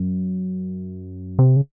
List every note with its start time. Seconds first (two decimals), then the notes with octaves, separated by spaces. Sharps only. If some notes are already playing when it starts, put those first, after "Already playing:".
Already playing: F#2
1.39 C3
1.56 C#3